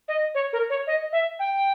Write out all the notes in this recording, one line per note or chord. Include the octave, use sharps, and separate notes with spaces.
D#5
C#5
A#4
C#5
D#5
E5
G5